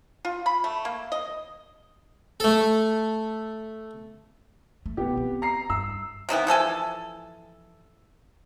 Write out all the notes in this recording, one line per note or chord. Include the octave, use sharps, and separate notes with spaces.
F4
B5
A3
A#3
D#5
A3 A4
A3
B2 B3 G4
C4
A#5 C7
G2 E6
C3 D#3 E3 B3
E3 F3 A4 G#5